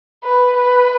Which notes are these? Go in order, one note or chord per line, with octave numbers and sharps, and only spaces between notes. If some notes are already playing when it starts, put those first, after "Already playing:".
B4
B4